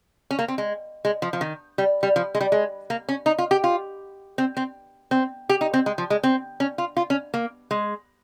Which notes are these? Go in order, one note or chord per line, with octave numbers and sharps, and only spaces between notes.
C#4
A#3
C4
G#3
G#3
F3
F3
D#3
G3
G3
F3
G#3
G3
G#3
A#3
C#4
D#4
F4
G4
F4
C4
C4
C4
G4
D#4
C4
G#3
F3
G#3
C4
C#4
F4
F4
C#4
A#3
G#3